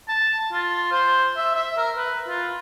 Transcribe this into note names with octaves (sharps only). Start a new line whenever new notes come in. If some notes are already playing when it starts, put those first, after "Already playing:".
A5
F4
C5
E5
E5
A#4
B4
F4